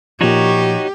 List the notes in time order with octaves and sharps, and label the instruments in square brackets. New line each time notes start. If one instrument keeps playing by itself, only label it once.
[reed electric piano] A#2 F3 [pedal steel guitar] D#4 F#4 C#5 [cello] G4